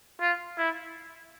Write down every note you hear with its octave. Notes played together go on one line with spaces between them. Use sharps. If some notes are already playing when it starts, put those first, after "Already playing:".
F4
E4